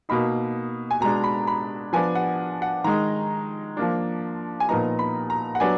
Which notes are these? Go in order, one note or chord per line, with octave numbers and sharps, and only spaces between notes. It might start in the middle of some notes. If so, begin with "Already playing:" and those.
B2 A#3 D#4 B5
G#5
B2 G#3 D4 A#5
B5
B5
F3 B3 D4 G#5
F#5
F#5
D#3 G#3 D#4 A#5
F3 A#3 D4
G#5
A#2 F3 B3 D#4 A#5
B5
A#5
F#5
F#3 B3 D4 G#5